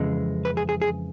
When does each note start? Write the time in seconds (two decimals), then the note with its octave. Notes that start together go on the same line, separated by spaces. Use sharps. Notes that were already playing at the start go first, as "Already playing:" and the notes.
Already playing: F2 C#3 E3 G#3
0.45 B4
0.57 G#4
0.69 G#4
0.82 G#4